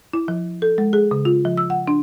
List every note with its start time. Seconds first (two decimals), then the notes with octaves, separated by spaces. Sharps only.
0.13 E4
0.28 F3
0.62 A4
0.78 G#3
0.93 G#4
1.11 C#3
1.25 F4
1.45 F3
1.57 E6
1.70 F#5
1.88 D4